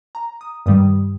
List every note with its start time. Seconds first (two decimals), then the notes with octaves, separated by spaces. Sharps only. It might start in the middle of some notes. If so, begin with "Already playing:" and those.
0.15 A#5
0.41 D#6
0.66 G2 D#3 G3 D#6